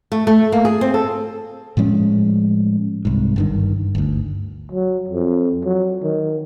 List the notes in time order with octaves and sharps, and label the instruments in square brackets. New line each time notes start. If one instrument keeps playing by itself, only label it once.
[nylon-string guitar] A3
A3
A#3
G#4
C4
A4
[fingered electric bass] A2 F3 G#3 C#4
C2 G#2
G1 G2 D#3
G1 D2
[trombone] F#3
F2
F#3
D#3